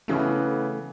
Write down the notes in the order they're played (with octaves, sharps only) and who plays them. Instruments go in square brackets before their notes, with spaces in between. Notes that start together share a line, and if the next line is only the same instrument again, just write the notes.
[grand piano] C#3 E3 B3 [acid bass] A3